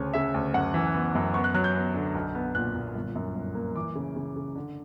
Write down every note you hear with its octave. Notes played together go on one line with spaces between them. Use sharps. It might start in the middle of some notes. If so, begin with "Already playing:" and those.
Already playing: D2 C#3 C#5
C#3 E5
D2
F#2 F#5
E3
B3
F#2
B3 C#6
F#6
F#3 F#6
G6
B3
D3
B1
B3
A#2 F#6
A#2
G1
F#2
G1
A#3
E3 D6
C#3
C#3
C#3
D3